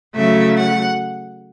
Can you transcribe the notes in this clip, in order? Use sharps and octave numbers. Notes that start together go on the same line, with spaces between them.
C#3 F#3 A3 E5
F#5